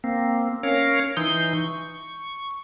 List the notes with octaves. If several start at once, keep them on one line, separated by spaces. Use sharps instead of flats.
A#3 C4
C#4 A#4 C#5 F5
E3 D#4 C6 G6
C#6